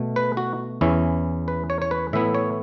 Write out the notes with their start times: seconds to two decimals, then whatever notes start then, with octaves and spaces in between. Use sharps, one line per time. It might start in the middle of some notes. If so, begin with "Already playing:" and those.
Already playing: B2 A3
0.16 B4
0.37 F#4
0.81 E2 E3 C#4 E4
1.48 B4
1.70 C#5
1.82 C#5
1.91 B4
2.13 A2 E3 B3 E4 E5
2.35 C#5